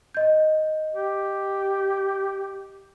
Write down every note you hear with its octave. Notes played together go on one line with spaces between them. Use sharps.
D#5 G6
G4